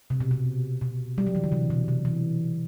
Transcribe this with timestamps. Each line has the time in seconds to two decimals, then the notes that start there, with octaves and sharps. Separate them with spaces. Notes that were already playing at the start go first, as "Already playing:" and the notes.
0.10 C3
0.20 B2
0.31 C3
0.81 B2
1.18 G3
1.27 F#3
1.35 E3
1.44 D3
1.52 C3
1.70 B2
1.88 C3
2.05 E3